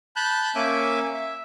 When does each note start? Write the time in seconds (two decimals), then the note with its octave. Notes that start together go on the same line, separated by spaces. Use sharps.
0.16 A5 B5 F#6 G6
0.55 A#3 C#4 E5 G#5 D6
1.14 E5